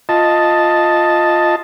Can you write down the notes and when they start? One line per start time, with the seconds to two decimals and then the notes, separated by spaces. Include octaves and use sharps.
0.09 F4 D#5 A5